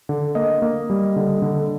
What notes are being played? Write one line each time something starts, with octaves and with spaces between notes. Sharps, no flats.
D3
A#3 D#5
A#3
G3
D3
D3